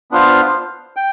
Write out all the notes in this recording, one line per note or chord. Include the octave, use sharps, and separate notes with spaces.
B3 D4 F4 C5 F5
G5